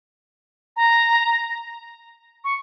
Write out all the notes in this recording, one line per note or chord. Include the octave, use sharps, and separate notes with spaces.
A#5
C#6